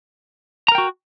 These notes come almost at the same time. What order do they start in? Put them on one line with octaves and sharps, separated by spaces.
A#5 A#4 G5 F#4